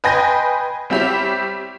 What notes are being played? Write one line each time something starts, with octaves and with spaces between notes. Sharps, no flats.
B4 D#5 G5 G#5 C6 A#6
G3 C4 E4 G4 C#5